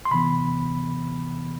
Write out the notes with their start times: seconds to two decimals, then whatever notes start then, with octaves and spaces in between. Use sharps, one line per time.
0.05 C6
0.11 C3 E3 B3 B5